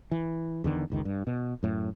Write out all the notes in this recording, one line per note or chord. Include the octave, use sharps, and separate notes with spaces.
E3
E2 D3 D#3
F#1 C#2 D#3
G2
B2
F#2 A2